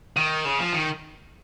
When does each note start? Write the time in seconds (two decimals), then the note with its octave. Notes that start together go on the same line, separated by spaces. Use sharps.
0.17 D#3
0.45 C#3
0.59 F3
0.73 D#3